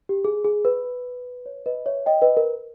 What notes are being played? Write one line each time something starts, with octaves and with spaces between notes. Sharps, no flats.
G4
G#4
G#4
B4
C#5
B4 D#5
C#5 E5
D#5 G5
B4 D#5
A#4